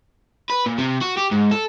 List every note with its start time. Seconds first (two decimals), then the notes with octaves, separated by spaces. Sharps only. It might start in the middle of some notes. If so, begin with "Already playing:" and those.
0.50 B4
0.66 A#2
0.79 C3
1.02 F#4
1.18 G4
1.32 G#2
1.52 A4